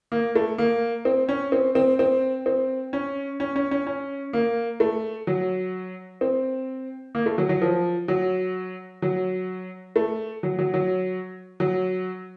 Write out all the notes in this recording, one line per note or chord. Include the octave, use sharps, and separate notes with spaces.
A#3
A3
A#3
C4
C#4
C4
C4
C4
C4
C#4
C#4
C#4
C#4
C#4
A#3
A3
F#3
C4
A#3
A3
F#3
F#3
F3
F#3
F#3
A3
F#3
F#3
F#3
F#3